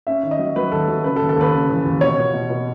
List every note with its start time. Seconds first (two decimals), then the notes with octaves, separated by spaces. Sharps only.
0.07 C#4 E5
0.23 D#3
0.31 D#5
0.39 F#3
0.56 F#3 B4
0.72 D#2 A4
0.88 F#3
1.04 C#3 B4
1.16 A4
1.20 D#2
1.29 A4
1.37 D#2 B4
1.54 C#3
1.69 E3
1.85 D#2
2.01 B2 C#5
2.18 B2
2.34 B2
2.50 B2